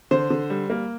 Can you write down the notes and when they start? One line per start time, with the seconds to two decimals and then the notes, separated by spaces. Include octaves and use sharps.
0.11 D3 C5
0.30 D3
0.50 G3
0.70 A#3